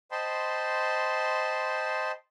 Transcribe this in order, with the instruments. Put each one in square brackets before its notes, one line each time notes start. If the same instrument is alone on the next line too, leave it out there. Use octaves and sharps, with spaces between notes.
[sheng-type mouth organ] C5 D#5 G5 A5 B5 C6